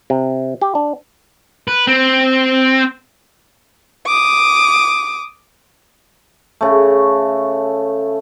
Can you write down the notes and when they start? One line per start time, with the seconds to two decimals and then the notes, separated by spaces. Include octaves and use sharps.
0.10 C3
0.62 G4
0.75 D4
1.68 B4
1.87 C4
4.06 D6 D#6
6.61 C#3 A3